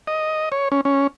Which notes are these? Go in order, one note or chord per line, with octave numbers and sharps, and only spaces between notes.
D#5
C#5
C#4
C#4